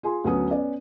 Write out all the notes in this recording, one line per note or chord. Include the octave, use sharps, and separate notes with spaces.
F4 G#4 G#5 C6
D2 F#3 B3 C#4 D#6
B3 C#4 D5